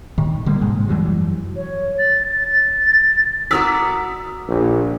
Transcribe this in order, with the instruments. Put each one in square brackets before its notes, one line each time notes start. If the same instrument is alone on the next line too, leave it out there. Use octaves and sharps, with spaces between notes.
[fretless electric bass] A2 D#3
D3 G3 G#3 A#3
G#2 C3 G#3
F#2 E3 F#3 G3
[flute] C#5
A6
A6
[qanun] F#4 A#4 D5 [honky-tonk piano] D#6 E6 B6
[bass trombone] A#1